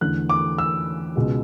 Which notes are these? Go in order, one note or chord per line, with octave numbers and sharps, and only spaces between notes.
E2 D3 A3 F#6
D6
E6
C#2 B2 G#3